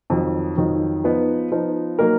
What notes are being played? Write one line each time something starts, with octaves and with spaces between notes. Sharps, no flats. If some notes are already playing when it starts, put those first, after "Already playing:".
F2 D#3 F#3
F2 D#3 F#3
F3 B3 D#4
F3 B3 D#4
F#3 A#3 D#4 A#4